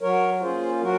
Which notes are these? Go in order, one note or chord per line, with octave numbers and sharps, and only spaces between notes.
F#3 A#4 C#5
A#3 C#4 F4 G#4 C5
F#3 F#4 A#4